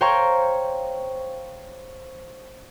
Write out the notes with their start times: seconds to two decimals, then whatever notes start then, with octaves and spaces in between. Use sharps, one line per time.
0.01 C5 C#5 F5 G5 A#5 C#6